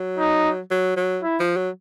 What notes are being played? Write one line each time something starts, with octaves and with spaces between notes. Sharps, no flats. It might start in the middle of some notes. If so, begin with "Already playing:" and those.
Already playing: F#3
D#4
F#3
F#3
E4
F3
F#3